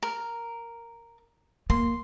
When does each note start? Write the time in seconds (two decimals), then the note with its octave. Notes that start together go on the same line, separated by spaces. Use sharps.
0.03 A#4
1.70 A#3 C6